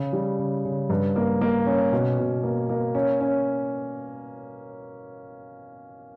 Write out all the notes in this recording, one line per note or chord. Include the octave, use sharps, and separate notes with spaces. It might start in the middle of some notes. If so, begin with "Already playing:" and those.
Already playing: C#3
G3
C#3
C#3
G2
A#3
A#3
C#4
B2
B2
A#3
A#3
C#4
C#4